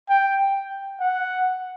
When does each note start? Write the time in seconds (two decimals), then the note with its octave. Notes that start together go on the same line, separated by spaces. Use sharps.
0.09 G5
1.00 F#5